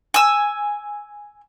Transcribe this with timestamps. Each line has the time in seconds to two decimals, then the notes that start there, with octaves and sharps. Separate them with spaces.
0.14 G#5 E6